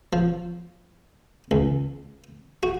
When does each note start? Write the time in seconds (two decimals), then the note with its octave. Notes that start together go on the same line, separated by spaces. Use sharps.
0.13 F3
1.51 C#2
2.63 F#4